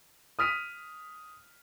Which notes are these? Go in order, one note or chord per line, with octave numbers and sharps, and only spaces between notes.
D#6 F6 B6 D#7